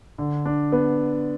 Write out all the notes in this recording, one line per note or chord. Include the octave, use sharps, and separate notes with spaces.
D3
D4
B3